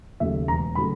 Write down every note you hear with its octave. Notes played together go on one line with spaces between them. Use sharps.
D#2 C#3 F#3 A3 E5
E1 A#5
C#3 F#3 A3 B5